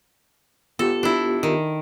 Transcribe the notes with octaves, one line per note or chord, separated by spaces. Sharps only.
B3 F4 G4 A4
D4 E4
D#3